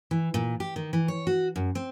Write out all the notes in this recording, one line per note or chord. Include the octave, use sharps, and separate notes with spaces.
E3
A#2
G4
D#3
E3
C#5
F#4
F#2
C4